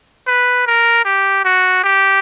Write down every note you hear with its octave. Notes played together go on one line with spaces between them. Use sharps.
B4
A#4
G4
F#4
G4